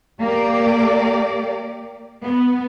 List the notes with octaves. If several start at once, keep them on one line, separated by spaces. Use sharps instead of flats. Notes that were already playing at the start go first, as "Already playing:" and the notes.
A#3 G4 D5
B3